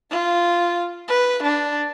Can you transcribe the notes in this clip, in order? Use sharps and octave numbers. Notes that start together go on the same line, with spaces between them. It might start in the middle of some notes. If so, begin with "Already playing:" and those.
F4
B4
D4